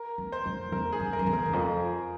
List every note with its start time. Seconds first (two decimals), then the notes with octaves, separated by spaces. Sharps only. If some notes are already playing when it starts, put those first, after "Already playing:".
Already playing: A#4
0.18 E2
0.32 C5
0.46 F2
0.72 E2 A#4
0.92 G#4
1.00 F2
1.13 A#4
1.19 F2
1.26 E2
1.33 A#4
1.46 E2
1.53 F2